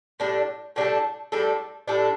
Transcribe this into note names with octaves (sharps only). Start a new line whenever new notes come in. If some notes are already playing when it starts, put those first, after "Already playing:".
A2 G3 D4 A4
A2 G3 D4 A4
A2 G3 D4 A4
A2 G3 D4 A4